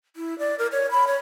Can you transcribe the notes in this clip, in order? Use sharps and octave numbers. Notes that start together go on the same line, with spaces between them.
E4
D5
A#4
C#5
B5
C#5